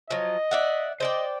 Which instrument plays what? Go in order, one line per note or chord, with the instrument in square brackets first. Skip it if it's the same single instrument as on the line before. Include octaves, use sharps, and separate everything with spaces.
[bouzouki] F3 F#3 [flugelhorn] D#5
[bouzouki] D5 E5 F#5
[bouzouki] C5 D5 G5 [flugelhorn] D#5